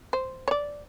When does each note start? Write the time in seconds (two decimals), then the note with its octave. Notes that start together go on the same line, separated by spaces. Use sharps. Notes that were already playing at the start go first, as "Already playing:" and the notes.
0.13 C5
0.48 C#5 D5